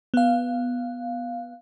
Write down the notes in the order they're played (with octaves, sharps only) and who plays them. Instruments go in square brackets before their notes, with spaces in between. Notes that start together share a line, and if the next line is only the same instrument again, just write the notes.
[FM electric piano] B3 F5